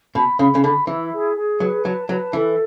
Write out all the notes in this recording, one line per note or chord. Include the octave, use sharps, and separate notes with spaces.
B2 B5
C#3 B5
C#3
D3 B5
E3 E4
G#4
G#4
F#3 B4
F#3 A5
F#3 B4
E3 A4